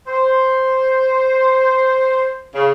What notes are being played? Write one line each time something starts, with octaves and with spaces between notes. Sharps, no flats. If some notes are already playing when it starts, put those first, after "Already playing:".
C5
C#3